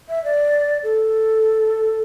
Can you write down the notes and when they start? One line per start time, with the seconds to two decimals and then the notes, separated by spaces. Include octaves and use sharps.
0.09 E5
0.24 D5
0.83 A4